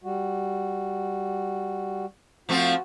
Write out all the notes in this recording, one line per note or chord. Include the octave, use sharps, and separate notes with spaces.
G3 F#4
F3 A3 C4 F#4